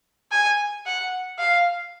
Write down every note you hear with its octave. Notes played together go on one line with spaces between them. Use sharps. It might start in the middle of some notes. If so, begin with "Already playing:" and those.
G#5
F#5
F5